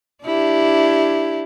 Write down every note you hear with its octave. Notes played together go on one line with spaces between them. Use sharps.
D4 E4 G4